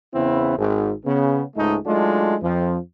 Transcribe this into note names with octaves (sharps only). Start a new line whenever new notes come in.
E2 C#3 B3 C4 E4
G#1 G#2
C#3 B3
C#2 G#2 G#3 A3 D#4
F#3 G#3 A3 D4 D#4 F4
F2 F3